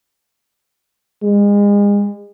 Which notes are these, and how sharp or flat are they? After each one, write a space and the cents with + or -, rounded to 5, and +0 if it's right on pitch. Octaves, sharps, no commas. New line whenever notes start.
G#3 -35